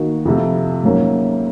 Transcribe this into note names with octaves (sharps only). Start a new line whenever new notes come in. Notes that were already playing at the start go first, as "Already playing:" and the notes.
Already playing: D#3 A#3 D#4 F#4
F2 C3 F3
G#2 F#3 A#3 C#4